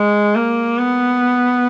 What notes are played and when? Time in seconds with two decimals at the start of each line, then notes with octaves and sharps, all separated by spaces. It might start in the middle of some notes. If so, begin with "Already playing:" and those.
Already playing: G#3
0.36 A#3
0.78 B3